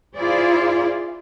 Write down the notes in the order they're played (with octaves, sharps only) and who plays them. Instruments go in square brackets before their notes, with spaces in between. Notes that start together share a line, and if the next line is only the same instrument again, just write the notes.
[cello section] E4 F4 G#4 C5 D5